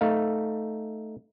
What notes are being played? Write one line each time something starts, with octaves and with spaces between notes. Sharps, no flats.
A3 D#4 F5